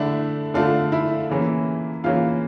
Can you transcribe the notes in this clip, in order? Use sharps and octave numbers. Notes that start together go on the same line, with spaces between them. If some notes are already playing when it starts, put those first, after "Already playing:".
Already playing: D3 A3 D4 E4 E5
D3 A3 D4 F4 F5
E4 E5
C#3 E3 A#3 C#4
C#3 E3 A#3 C#4 F4 F5